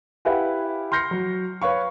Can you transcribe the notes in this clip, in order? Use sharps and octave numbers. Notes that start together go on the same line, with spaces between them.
E4 G4 B4 F5 F#5 G#5
C6 F6 G6 A#6 C7 C#7
F#3
B4 C#5 F5 C#6